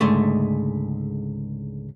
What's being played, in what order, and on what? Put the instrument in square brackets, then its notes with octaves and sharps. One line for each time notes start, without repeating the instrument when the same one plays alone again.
[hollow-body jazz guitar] C#2 G#2 D3 G#3 A3